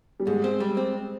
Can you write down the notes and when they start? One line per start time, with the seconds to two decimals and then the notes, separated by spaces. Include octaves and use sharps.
0.20 G3
0.27 G#2 G#3
0.44 C4
0.60 G3
0.77 C4